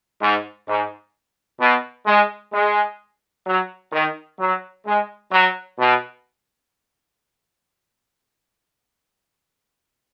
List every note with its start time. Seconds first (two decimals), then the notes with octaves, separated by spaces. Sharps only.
0.20 G#2
0.67 G#2
1.60 B2
2.06 G#3
2.53 G#3
3.46 F#3
3.92 D#3
4.39 F#3
4.86 G#3
5.32 F#3
5.79 B2